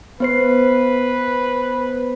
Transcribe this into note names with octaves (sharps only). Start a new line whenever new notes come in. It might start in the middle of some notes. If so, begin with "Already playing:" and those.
B3 B4 C5 C7